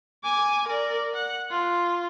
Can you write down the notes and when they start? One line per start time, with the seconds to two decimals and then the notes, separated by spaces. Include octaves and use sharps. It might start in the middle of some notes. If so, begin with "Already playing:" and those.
0.24 G#5 D6
0.67 A#4 D5
1.15 F#5
1.51 F4